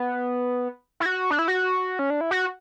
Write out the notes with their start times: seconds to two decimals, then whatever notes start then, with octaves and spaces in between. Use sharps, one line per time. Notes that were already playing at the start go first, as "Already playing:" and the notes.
Already playing: B3
1.00 E4
1.06 F#4
1.31 D4
1.39 E4
1.48 F#4
1.99 C#4
2.10 D4
2.21 E4
2.31 F#4